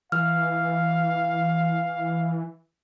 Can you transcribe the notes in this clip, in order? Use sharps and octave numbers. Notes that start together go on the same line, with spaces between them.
E3 F5 F6